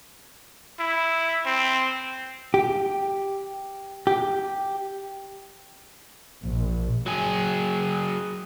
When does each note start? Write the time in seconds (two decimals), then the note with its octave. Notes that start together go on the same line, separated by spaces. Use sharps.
0.79 E4
1.46 C4
2.54 G4
4.07 G4
6.44 A#1
7.06 F#3 G#4